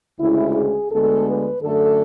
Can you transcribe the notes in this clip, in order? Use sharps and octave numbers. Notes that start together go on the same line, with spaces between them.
D2 C#3 G#3 E4
G#4
D2 D3 G#3 B3 A4
B4
F#2 D3 A3 A4